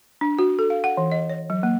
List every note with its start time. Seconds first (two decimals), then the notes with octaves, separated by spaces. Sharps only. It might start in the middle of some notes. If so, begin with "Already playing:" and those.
0.21 D4
0.39 F#4
0.59 A4
0.70 F5
0.84 F#5
0.97 E3
1.12 D#5
1.29 C#5
1.50 F#3
1.63 A#3